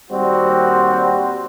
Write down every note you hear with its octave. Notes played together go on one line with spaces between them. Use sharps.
D#2 G3 C4 F#4